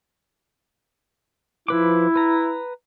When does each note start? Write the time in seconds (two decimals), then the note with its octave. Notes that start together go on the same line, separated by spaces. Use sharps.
1.68 F3 E4 B4 D6
2.16 B4 A#5